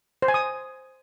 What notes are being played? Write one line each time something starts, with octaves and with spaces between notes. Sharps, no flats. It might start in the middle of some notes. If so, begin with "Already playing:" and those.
C5
G#5
D#6